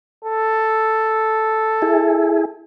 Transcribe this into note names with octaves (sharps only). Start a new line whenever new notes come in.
A4
E4 G#4